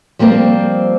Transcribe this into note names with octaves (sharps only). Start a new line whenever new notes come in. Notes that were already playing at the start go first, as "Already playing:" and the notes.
F3 G3 A#3 C4 A#4